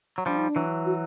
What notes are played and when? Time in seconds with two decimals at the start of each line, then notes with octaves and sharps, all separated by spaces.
0.18 F#3
0.26 F3 G3 D4
0.37 D#4
0.49 D4
0.56 E3 F#3
0.86 F#4